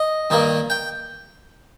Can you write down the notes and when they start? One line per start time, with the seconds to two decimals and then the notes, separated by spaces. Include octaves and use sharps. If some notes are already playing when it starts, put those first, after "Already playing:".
Already playing: D#5
0.30 G2 D#3 A#3
0.70 G5